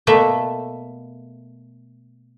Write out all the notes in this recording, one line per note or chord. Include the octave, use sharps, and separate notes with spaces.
B2 A3 A#3 E5